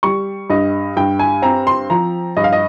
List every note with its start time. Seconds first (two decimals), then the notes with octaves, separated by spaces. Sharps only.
0.03 G3 C#6
0.50 G2 D#5
0.97 G2 G5
1.19 G#5
1.42 C4 A#5
1.67 C6
1.90 F3 A#5
2.37 G2 D#5
2.44 F5
2.53 D#5